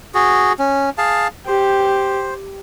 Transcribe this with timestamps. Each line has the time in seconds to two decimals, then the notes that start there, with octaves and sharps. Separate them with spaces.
0.14 F#4 G#4
0.59 C#4
0.98 G#4 F5 A5
1.47 G4 C5